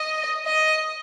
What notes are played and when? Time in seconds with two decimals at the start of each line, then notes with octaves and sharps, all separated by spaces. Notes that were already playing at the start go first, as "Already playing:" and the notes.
Already playing: D#5
0.46 D#5